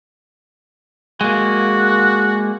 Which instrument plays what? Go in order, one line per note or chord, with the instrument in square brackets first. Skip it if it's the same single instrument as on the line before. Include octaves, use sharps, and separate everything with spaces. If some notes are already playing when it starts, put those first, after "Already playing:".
[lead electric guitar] G#3 A#3 [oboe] F#4